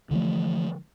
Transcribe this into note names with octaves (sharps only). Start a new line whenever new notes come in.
D3 E3 F3 A3